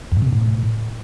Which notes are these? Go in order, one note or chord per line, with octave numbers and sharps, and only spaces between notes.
F2
A2
C3
B2
A2